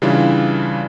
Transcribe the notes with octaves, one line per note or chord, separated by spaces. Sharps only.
C#3 E3 G3 D4 E4 F4